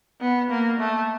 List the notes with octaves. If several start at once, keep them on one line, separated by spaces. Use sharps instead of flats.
B3
A#3
A3